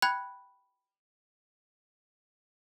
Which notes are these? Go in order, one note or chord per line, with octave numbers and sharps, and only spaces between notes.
G5 B5 F#6 G#6